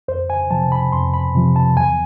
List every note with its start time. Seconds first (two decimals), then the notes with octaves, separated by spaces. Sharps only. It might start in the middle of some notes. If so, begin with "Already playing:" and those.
0.08 F2 C5
0.30 G#5
0.51 C3 F3 A5
0.72 B5
0.92 F2 C6
1.14 B5
1.35 C3 F3
1.56 A5
1.77 E2 G#5